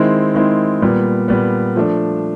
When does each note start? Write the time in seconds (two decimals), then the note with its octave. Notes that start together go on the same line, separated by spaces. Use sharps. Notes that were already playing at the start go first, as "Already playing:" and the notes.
Already playing: D#3 G#3 C4 E4
0.34 D#3 G#3 C4 E4
0.82 A#2 G3 B3
1.28 A#2 G3 B3
1.76 F3 A3 D4